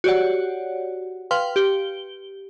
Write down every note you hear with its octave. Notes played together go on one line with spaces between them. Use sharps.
F#4 G4 C#5 D5 F#5
B4 F5 G5 C6 F6
G4 G7